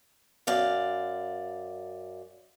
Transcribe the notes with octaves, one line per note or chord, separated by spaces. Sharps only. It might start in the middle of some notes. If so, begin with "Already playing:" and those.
F#2 D5 F5